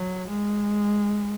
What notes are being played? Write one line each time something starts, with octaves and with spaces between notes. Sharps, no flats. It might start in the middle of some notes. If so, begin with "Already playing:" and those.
Already playing: F#3
G#3